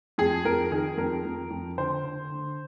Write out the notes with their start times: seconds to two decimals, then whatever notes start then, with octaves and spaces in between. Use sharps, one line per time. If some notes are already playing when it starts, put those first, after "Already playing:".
0.18 F2 G#4
0.45 F2 A#4
0.71 D#3 G#4
0.97 F2 A#4
1.25 F2
1.50 F2
1.78 D3 C5
2.03 D3
2.30 D3